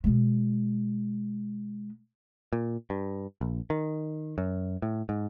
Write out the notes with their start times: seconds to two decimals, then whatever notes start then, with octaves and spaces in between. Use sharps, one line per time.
0.04 B2 G#3
2.53 A#2
2.90 G2
3.41 A#1
3.70 D#3
4.38 F#2
4.82 A2
5.09 G#2